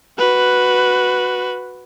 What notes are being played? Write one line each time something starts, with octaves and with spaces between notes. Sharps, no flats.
F#4 B4